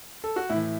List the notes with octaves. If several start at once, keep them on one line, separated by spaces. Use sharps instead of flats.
A4
F#4
A2 E3 E4